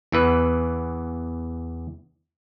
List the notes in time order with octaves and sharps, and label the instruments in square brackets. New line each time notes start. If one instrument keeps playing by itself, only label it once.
[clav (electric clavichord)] E2 E3 B4